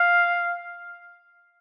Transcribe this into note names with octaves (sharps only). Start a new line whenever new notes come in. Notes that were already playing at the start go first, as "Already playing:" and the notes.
Already playing: F5